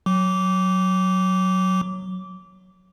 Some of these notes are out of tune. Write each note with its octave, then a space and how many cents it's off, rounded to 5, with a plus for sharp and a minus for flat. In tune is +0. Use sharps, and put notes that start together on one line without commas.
F#3 +0 D6 -20